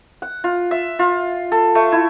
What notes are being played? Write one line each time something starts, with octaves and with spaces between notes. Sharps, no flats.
F#5
F4
E5
F4
A4
A3
E4